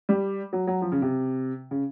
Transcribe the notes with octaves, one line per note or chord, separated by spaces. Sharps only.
G3
F#3
F#3
F3
C#3
C3
C#3